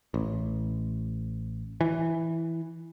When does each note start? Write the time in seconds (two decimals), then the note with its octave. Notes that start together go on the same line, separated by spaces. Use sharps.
0.14 A1
1.81 E3